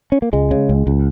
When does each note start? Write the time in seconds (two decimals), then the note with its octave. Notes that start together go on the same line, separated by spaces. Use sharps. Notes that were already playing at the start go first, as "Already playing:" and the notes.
0.12 C#4
0.22 A#3
0.33 C#2 G#3
0.51 C#3
0.69 C#2
0.87 C#2